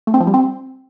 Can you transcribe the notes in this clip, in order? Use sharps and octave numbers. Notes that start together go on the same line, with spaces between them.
A3
C4
F3
G3
C4